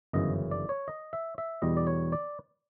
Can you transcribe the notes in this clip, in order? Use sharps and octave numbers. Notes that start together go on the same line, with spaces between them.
G1 F#2 C#3 E3 D#5
D5
C#5
D#5
E5
E5
E2 B2 G3 D#5
D5
C#5
D5